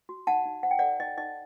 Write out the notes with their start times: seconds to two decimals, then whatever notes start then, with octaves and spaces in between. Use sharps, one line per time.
0.09 F#4
0.27 D#4 F#5 A5
0.46 D#4
0.63 C5 F#5
0.71 G5
0.79 A4 D5 F#5
1.00 D#4 D#5
1.18 D#4 D#5